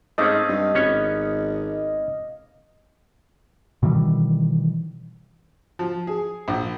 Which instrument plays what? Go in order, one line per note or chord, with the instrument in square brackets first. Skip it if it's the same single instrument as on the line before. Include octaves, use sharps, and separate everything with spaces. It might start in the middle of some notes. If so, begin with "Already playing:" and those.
[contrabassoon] G#2 [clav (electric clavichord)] A3 C4 C#4 [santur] D#5 F5 D6
[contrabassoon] G2
[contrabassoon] G#1 [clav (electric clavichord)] B3 C#4 C#5
[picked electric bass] B2 D#3 E3 G3
[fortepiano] F3
G#4
A#1